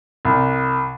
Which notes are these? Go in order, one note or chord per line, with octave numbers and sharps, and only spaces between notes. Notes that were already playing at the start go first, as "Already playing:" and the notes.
C2